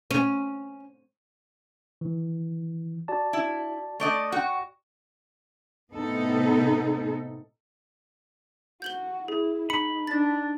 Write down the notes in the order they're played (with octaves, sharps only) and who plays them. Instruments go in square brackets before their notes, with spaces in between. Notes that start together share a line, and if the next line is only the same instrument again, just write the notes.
[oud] C#4
[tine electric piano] E3
F#4 D5 A5
[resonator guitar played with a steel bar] E4
A3 D5 D#5
[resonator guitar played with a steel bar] F#4 [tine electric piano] F#5 G5
[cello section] A2 C3 B3 D#4 A4
[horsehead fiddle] F#4 [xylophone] G6 F#7 G7
[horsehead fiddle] E4 [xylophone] G#4
[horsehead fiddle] D#4 [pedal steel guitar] B5 [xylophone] C#7
[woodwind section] D4 [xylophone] A6